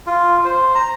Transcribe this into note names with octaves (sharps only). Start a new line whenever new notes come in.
F4
C5
A#5